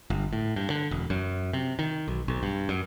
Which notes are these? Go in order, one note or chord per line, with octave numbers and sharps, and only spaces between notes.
G1
A2
G2
D3
E1
F#2
C3
D#3
B1
B1
G2
F#2